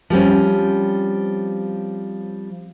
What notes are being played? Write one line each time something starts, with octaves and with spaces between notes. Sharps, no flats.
F3 G3 C4 C#4